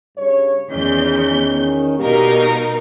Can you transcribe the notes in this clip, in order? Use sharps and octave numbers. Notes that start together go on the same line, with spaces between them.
G2 C#3 C#5
E2 D#3 C#4 G6
B2 G3 A#3 D#4 G4 A#4